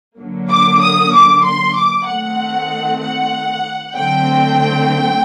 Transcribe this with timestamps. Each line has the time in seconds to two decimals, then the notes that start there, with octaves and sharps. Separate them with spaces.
0.18 D3 F#3 A#3
0.50 D6
0.81 D#6
1.12 D6
1.44 C6
1.75 D6
2.07 D#3 A3 C4 F#5
3.01 F#5
3.95 D3 F#3 A3 C4 G5